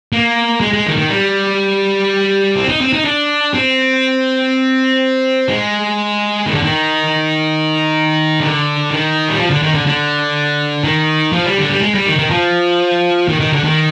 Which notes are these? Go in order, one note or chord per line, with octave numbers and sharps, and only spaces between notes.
A#3
G#3
G#3
D#3
D#3
G3
C4
D#4
C4
D#4
D4
C4
G#3
D#3
D3
D#3
D3
D#3
G3
F3
D3
D#3
D3
D3
D#3
F3
G3
D3
G3
G#3
G3
D#3
D#3
F3
D#3
D#3
D3
D#3